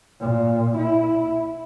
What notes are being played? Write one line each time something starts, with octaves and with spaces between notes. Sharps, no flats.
A#2
E4